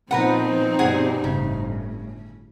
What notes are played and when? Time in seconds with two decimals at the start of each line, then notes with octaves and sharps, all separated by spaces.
0.11 A#2 F3 B3 C4 D#4 A#4 B4 F#5
0.79 G2 B2 G3 G#4 F#5 G#5
1.24 G1 A2 C#3